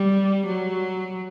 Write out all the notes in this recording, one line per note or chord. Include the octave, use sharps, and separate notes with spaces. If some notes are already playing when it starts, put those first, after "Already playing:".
Already playing: G3
F#3